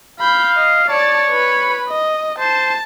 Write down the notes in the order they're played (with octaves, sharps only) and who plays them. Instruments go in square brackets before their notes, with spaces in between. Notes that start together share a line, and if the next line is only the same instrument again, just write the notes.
[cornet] F5 [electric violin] B5 G6
[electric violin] D#5
[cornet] C#5 [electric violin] D5 A5
[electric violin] B4 B5
D#5
[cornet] C5 [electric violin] A5